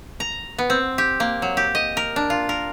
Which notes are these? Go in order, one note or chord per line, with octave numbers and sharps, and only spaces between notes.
A#5
B3
C4
G4
A#3
F#3
G4
D#5
A#4
D4
F4
A#4